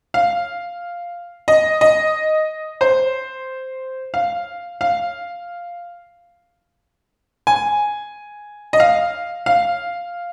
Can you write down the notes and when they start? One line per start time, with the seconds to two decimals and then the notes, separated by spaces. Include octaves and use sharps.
0.14 F5
1.48 D#5
1.81 D#5
2.81 C5
4.14 F5
4.81 F5
7.47 G#5
8.73 D#5
8.80 F5
9.46 F5